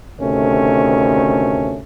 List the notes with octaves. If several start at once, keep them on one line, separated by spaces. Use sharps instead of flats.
D2 C3 D#3 A3 C#4